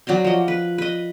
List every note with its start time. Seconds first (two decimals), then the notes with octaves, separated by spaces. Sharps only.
0.07 F#3 D5 A#5 C6
0.24 F3 D#5
0.48 B4
0.78 B4 D#5